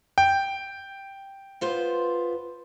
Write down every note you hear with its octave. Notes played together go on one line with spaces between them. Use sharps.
G5
B3 F4 C5